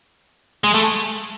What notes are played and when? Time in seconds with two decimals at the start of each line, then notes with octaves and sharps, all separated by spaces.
0.64 G#3
0.74 A3